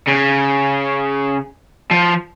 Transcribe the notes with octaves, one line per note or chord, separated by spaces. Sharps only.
C#3
F3